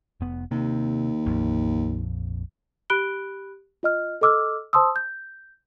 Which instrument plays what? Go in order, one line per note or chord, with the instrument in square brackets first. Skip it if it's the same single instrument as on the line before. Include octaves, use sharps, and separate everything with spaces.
[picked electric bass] F1 B3
[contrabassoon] D#2 [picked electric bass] C3
[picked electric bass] A#1 F2
[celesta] G4 B5 F#6 D7 G7
F4 D#5 F6
A4 D#5 D6 E6 F6
C5 A5 C6 D#6 E6
G6